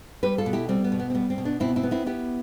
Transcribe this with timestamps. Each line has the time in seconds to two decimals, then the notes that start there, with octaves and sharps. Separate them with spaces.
0.23 G3 G4 B4
0.38 F4 A4
0.46 B2
0.53 E4 G4
0.69 G3 C4
0.84 B3
0.92 B2
1.00 B3
1.10 C4
1.14 G3 B3
1.30 C4
1.38 B2
1.45 B3 D4
1.60 B2 C4 E4
1.76 C4 E4
1.83 B3
1.91 C4 E4
2.06 B3 E4 G4